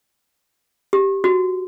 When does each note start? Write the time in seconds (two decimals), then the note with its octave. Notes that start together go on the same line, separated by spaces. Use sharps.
0.93 G4
1.24 F#4